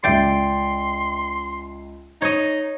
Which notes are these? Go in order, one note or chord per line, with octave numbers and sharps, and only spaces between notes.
C#2 D5 E5 G5 C6 C7
D#4 C#5 D#5